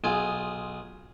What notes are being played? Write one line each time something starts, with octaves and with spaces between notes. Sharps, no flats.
B1 F4 G#4